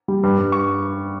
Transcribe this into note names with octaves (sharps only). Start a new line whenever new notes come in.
G3
G2
G2
C#6